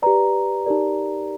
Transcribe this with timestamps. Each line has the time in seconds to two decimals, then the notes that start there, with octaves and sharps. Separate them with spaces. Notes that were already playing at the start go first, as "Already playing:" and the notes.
0.02 G4 B4 D5 A#5
0.66 D#4 G4 A#4 D5